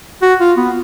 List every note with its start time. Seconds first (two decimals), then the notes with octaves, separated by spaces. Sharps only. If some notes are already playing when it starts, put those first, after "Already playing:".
0.22 F#4
0.40 F4
0.57 B3